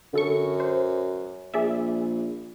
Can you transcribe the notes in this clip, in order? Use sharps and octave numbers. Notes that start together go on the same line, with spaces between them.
F#2 D3 A4 C#6
C5
A#1 G#4 D5 E5